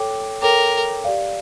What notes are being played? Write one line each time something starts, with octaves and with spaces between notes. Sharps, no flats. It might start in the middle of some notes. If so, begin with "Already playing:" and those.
Already playing: A4 C#5 G5 D6
A4 A#4 C#5 G5 D6
G4 D5 F5